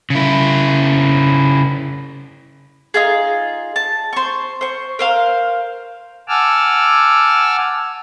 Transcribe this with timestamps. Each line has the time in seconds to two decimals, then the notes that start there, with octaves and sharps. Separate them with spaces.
0.10 C#3 E4
2.94 D#4 F4 G#4
3.76 A5
4.13 C5 C#6
4.61 C5 C#6
4.99 A#4 C5 F5
6.28 F#5 G#5 A5 D6 E6 F6